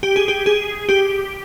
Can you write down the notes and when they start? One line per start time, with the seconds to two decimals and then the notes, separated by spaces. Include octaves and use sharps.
0.03 G4
0.16 G#4
0.28 G4
0.46 G#4
0.89 G4